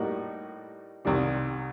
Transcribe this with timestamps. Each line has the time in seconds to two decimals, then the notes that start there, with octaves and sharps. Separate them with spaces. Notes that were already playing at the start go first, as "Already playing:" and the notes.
Already playing: A2 G3 A#3 D#4 F#4
1.05 C2 C3 D#3 G3